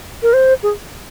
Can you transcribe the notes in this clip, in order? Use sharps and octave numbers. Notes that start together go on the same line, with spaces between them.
A#4
C5
G#4